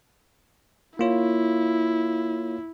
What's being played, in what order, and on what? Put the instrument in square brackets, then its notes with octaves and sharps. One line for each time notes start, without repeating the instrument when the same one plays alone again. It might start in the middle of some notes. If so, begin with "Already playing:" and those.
[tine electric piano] A#3 F4 C#5 [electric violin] E4